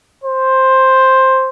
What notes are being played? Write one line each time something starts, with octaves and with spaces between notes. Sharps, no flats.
C5